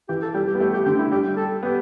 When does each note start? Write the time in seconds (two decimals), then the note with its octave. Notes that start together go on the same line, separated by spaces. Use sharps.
0.09 E3 G4
0.22 A4
0.34 G3 G4
0.48 G4
0.55 B3
0.60 A3 G4
0.74 G4
0.86 D3 G4
0.99 E4
1.11 G3 G4
1.37 A4
1.63 B3 G4